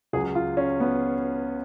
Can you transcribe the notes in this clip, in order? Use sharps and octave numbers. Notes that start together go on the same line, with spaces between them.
C#2 C#3 F#3 G#4
F4
C#4
B3